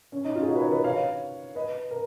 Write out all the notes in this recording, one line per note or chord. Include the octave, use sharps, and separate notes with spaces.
C#4
D#4
C#4 F4
G#4
D#4 F#4
B4
A#4 C#5
B4 D#5
C#5 F5
B4 D#5
A#4